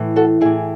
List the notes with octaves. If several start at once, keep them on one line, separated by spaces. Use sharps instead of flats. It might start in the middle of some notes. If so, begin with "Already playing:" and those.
Already playing: A2 E3
F#4 A4
A2 E3 E4 G#4